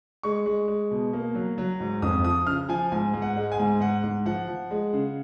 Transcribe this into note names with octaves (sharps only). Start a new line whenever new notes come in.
G#3 C#6
G#3
G#3
B2
A#3
F#3
F#3
G#2
F2 D#6
F3 D#6
C#3 F6
F3 G#5
G#2 G#5
G#2
F#5
G#3
G#5
G#2
G#2 F#5
G#2
F3 F#5
F3
G#3
C#3